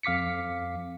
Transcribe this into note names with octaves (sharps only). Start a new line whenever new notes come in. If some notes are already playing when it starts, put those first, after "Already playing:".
F2 F5 D6 B6 C#7